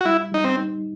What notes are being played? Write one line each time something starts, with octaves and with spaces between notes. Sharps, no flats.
F#4
G3 E4
G3 D#4
C4
D#4